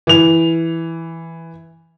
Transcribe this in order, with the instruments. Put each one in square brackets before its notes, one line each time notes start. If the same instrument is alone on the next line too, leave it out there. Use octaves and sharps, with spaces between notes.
[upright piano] E3 F7